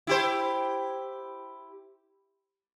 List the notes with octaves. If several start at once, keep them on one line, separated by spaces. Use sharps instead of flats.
E4 G4 C5